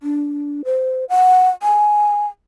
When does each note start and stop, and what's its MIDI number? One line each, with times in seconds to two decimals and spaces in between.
0.03 0.62 62
0.65 1.05 72
1.09 1.49 78
1.63 2.27 80